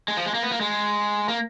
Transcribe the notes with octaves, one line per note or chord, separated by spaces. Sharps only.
G#3
F3
G#3
A#3
B3
A#3
G#3
A#3